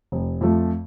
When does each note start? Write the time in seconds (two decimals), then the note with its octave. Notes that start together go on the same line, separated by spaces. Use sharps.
0.12 F1
0.41 F2 F3 A3